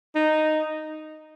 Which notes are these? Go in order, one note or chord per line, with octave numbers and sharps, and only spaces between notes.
D#4